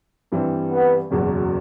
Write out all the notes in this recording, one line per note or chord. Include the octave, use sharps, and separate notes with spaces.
G2 E3 G3 C4
B3
F#1 E2 B2 F#3